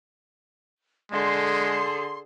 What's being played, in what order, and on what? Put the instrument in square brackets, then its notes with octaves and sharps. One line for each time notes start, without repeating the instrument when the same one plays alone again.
[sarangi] D3 [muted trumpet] G#3 [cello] G#4 A4 [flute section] C6